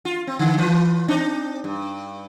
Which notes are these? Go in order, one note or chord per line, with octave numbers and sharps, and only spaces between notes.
F4
C4
D3 E3
E3 F4 B4
C4 D4 D#4
G2